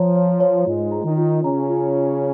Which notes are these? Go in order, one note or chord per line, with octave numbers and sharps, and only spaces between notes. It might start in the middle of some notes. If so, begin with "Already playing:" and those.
Already playing: F3 C#5 A#5
C#5
C#5
G#2 G#3 F4
A#5
D#3 D#4
F4
C#3 C#4 A#5
F4
F4